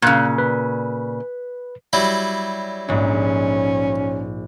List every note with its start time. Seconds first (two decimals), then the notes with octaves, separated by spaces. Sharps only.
0.02 A#2 C#3 F5 F#6 G6
0.38 B4
1.93 F#3 G3 E4
2.88 A#1 G#2 C#4